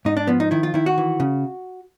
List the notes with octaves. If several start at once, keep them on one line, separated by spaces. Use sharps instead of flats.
G#2 D#4
D4
F3 B3
D#4
D#3 E4
F4
D#3 E4
F#4
E3
C#3